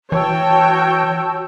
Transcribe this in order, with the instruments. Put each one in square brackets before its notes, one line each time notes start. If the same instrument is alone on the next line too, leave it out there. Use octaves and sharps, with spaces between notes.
[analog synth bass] E3 [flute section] F#4 A5 E6 [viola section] C#5 G5